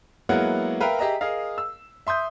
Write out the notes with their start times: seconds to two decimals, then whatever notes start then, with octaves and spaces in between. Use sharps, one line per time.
0.29 F#3 G#3 A#3 B3 E4 F#5
0.80 A#4 B4 E5 F5 G5 A#5
0.99 G4 G#4 D#5 E5 A#5
1.21 G#4 A#4 D#5 F5
1.58 E6
2.07 E5 C6 D#6 G6